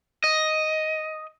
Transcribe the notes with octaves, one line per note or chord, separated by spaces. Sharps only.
D#5